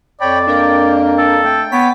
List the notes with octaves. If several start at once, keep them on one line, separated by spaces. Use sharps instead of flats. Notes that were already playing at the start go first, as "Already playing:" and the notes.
F2 C#5 D5 G5 B5
A#3 D4 A#4 G5
A4
A3 G5
B3 C#5 D6 B6